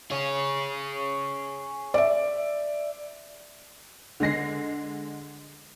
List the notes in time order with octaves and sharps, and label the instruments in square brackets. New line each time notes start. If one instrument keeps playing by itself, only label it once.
[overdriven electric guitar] G#4 C#5
[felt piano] D5 E5
[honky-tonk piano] D3 G#3 A#6 C7